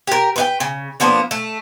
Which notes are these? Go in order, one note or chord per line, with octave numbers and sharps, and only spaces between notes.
G4 A#4
B4 D#5 G5
C#3
F3 A#3 B3 D4
A3